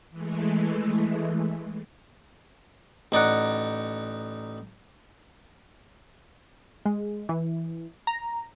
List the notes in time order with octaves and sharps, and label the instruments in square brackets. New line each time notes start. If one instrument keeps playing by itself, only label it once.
[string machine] E3 G#3 A3
[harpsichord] A1 D#4 D5 F#5
[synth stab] G#3
E3
A#5